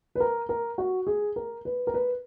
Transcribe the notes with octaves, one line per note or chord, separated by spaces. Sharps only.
B4
A#4
A#4
F#4
G#4
A#4
B4
A#4
B4